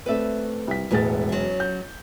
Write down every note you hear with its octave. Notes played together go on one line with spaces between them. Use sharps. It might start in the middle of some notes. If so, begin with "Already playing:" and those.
A3 C4 B4 D5 E5
C2 B6
E1 A2 G#3 B3 A6
F#2 F#3
G6